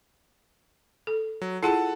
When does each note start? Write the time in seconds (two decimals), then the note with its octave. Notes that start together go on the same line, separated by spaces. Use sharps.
1.07 A4
1.41 F#3
1.63 E4 F4 G#4 A4 F#5 A5